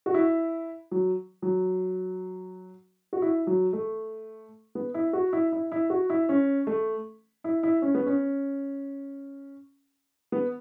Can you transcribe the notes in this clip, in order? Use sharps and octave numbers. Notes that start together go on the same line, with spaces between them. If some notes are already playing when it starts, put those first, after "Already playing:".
F#4
E4
F#3
F#3
F#4
E4
F#3
A3
B3
E4
F#4
E4
E4
E4
F#4
E4
C#4
A3
E4
E4
C#4
B3
C#4
B3